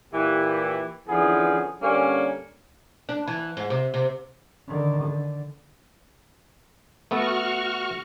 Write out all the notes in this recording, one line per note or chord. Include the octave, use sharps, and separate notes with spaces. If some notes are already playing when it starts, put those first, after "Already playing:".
A#2 E3 G4
D3 E3 F3 B3 C#4 G#4
D3 G3 A#3 C#4
D4
E3
G#2
C3
C3
D3 D#3
D3
A3 B3 F#4 A4 C#6 F6